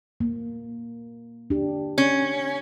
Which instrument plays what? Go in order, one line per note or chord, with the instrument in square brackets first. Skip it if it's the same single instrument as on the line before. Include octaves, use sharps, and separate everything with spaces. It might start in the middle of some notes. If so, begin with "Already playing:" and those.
[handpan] A#3
D4 G4
[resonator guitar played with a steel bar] C#4